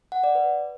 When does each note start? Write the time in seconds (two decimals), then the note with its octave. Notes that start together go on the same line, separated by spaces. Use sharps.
0.12 F#5
0.24 D5
0.35 B4